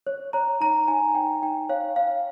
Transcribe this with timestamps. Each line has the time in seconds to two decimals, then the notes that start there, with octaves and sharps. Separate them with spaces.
0.07 C#5
0.33 C#5 A#5
0.60 D#4 A#5
0.88 D#4 G#5
1.15 D#4 G5
1.43 D#4 G5
1.69 C#5 F5
1.96 C#5 F5